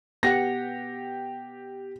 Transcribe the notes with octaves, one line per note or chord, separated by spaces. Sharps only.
B3 G4 F#5 A#6